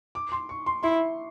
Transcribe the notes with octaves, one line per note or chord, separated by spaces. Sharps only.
D6
C6
C#6
C6
E4 C6